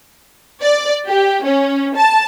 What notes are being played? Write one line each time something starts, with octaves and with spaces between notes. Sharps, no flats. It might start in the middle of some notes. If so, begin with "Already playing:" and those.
D5
G4
C#4
A5